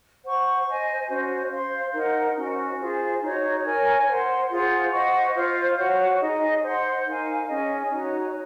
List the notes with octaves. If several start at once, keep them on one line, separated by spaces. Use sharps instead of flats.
C5 F#5 C#6
C5 D#5 G#5
C#4 F#4 C5
C5 F5 C6
D#4 A#4 D#5 F#5
C#4 F#4 C5
F4 G#4 C5 F5
D#4 F#4 C#5
A#4 C#5 G#5
C5 F#5 C6
F4 G#4 C5 F#5
C5 D#5 F#5 C#6
F4 C5 F5
F#4 C#5 F#5
D#4 G#4 D#5
C5 F#5 C6
D#4 A#4 F5 G#5
C#4 G#4 D#5 G#5
D#4 F#4 C#5